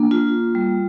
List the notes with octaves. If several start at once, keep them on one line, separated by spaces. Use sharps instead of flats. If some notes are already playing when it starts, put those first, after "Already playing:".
Already playing: A#3 D4
F4
G3